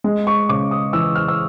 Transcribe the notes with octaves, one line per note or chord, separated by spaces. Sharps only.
G#3
C#6
C#3 D6
D#6
E3 E6
F6
E6